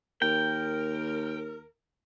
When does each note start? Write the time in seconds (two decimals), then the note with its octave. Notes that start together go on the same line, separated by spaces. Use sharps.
0.22 D#2 A#4 G5